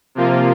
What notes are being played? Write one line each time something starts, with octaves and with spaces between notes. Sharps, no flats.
C3 F3 A#3 F4